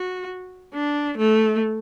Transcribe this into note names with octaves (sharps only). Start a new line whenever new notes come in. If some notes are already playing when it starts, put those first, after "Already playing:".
Already playing: F#4
D4
A3